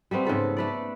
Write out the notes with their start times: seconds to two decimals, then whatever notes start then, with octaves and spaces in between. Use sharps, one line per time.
0.11 G3 A3 B3 C4
0.25 G#2 C#3 A4 B4
0.57 A3 B4 D5